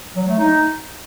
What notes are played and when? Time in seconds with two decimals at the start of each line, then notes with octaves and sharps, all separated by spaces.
0.16 F#3
0.27 A3
0.39 D#4